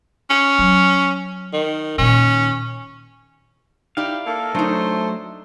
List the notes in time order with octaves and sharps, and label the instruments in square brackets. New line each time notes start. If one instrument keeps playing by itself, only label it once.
[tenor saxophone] C#4
[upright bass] F#3
[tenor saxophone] D#3
[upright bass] A#2 D#3 [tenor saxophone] C#4
[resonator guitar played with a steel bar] D#4 E4 D5 [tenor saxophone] G4 [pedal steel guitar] F5
[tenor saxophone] A#3 [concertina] A4
[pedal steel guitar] F#3 A3 [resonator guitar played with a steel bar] D4 D#4 [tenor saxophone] C5